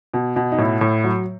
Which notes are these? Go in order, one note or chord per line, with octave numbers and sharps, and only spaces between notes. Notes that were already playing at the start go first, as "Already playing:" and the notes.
B2
B2
D#4
A2 E4
A2
F#3